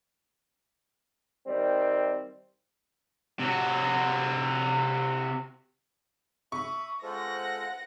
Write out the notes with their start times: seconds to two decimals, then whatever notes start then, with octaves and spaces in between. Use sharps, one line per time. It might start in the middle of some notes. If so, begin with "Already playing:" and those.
1.46 D#3 G3 C4
3.40 C3 F#4
6.52 E5 B5 C#6 D#6
7.03 G#3 F4 A4 C5 F#5 A#6